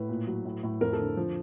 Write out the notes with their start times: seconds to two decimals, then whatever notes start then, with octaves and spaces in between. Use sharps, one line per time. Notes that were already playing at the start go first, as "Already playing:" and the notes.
Already playing: A2 B4
0.09 A#2
0.27 F#3
0.45 A2
0.63 A2
0.81 F2 A#4
0.93 A4
0.99 D3
1.17 F3